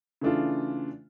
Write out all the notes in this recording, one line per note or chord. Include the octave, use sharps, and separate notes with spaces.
C#3 E3 A3 D4 F4